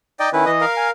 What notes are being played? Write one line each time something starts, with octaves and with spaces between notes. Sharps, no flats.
D#4 D5 D#5 G5
D#3 C#4 E4 B4
E3 D#5 D#6
A#4 F5
G#5